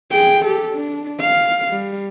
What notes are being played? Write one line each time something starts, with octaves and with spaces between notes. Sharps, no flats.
G#4 G5
G4 A4
D4
F5
G3